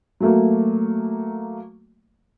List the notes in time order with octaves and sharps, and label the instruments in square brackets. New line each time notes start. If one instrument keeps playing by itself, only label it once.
[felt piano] F#3 A3 A#3